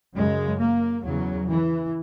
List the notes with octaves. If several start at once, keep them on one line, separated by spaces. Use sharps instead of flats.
F#2 C#3 G#3
A#3
E2 C#3 F#3
E3